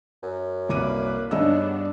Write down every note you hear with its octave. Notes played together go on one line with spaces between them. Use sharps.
F#2
C2 A#3 B4 D6 D#7
G2 C#3 B3 D4 D#4 D#5 E6